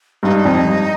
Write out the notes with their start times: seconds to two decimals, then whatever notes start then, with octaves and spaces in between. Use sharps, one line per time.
0.23 G2 D#4
0.45 F2
0.65 G2